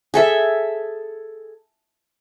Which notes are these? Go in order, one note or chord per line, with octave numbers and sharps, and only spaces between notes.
G#4 A4 E5